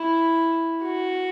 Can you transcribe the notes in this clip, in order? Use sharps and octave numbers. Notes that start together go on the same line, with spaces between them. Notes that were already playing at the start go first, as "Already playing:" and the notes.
Already playing: E4
F#4